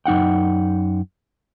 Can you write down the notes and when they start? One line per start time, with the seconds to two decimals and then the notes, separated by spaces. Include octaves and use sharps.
0.06 F#2 D#4 F#5 G5